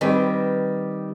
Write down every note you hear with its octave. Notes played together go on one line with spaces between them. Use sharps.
D#3 G3 C4 B4